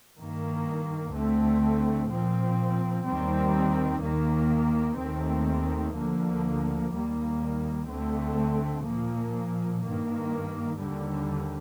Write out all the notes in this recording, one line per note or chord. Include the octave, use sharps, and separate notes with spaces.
G2 D#3 A#3
D2 D3 A3 C4
A#2 F3 C4
D#2 D#3 G3 C4
D#2 D#3 A#3
D#2 D#3 A3 C4
D2 D3 F3 A#3
D#2 D#3 G3 A#3
D2 D3 A3 C4
A#2 F3 A#3
G2 D#3 A#3
D#2 D3 G3